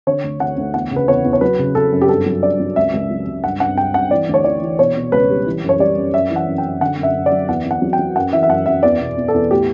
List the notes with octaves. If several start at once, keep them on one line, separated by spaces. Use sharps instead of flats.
D3 C#5
D2
D2 F#5
D2
E2 F#5
C#3
B4
E2 C#5
E2
C#5
F#3 B4
C#3
C#3 A4
F#2
G4
G2 A4
F#3
G2 D5
F#3
C#2 E5
C#2
F#3
C#2
G2 F#5
G2 F#5
G2 G5
G2 F#5
E3 D5
D2
C#5
E3 D5
E3
B2 C#5
B2
C#2 B4
G3
E3
F#2
C#5
G3 D5
F#2
F#2 E5
E3
F#5
F#2
G5
F#2
D3 F#5
F#2
E5
F#2
D5
F#3
E2 F#5
E2
F#5
F#3
G5
F#3
F#2 F#5
E3 E5
E5
F#2 F#5
F#2 E5
E2 D5
B2
E2
A4
E2
A2 G4